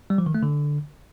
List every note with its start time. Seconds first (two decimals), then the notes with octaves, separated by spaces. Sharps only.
0.10 G3
0.18 F3
0.26 D#3
0.35 A3
0.43 D3